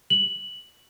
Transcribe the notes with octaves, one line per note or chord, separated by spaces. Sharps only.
F#7